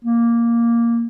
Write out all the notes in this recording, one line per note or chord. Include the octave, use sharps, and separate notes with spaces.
A#3